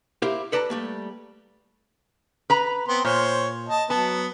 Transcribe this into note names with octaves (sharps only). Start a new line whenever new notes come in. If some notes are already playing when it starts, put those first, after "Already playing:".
E4 G4 A#4 C5 F5
A4 B4 D5 A5 A#5
G3 A3 A#3
B4 A#5
B3 C4 C6
A#2 C5 C#5
D#5 A5
F#3 B3 A5